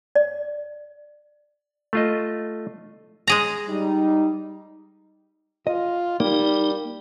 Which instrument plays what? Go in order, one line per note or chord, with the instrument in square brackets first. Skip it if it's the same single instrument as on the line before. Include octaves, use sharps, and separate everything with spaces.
[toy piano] D5
[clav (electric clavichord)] A3 F4 D#5
[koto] G#3 G#4 A#5
[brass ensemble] G3 D#4
[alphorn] F4 [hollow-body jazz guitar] D#5
[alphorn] G3 [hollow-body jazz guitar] A#3 [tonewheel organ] D#4